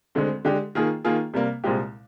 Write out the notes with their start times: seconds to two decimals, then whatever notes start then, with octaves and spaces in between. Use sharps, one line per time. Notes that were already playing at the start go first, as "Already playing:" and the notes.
0.15 D2 D3 G#3 C4
0.45 D3 G#3 D4 G4
0.75 D#3 A#3 F4 G#4
1.04 D#3 A#3 F4 G#4
1.34 C3 G3 A#3
1.64 C2 A#2 G#3 C4 G4